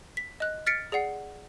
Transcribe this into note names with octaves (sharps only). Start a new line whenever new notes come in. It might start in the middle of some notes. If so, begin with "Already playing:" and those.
B6
D#5 F#6
F6 A6 B6 C#7 D7
G#4 D5 F#5 C7